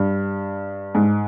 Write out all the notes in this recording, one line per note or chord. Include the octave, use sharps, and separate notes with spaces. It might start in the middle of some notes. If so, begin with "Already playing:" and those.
Already playing: G2
G#2